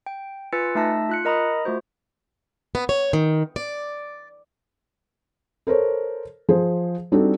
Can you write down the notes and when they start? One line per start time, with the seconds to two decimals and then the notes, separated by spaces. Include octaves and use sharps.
0.06 G5
0.53 F4 B4 G#5 E6 A6 C#7
0.75 A3 D#4 E5 A5 E6 A#6
1.09 F4 F#6 C#7
1.25 A#4 D#5 A#5 B5 D#6
1.65 A3 F4 F#4 C5
2.75 B3
2.89 C#5
3.13 D#3
3.56 D5
5.67 A4 A#4 C5 C#5
6.49 F3 G#4 C5
7.12 G3 C4 D4 D#4 F#4 A4